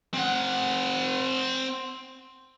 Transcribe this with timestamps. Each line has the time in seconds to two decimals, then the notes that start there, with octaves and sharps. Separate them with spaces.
0.14 C4 F#5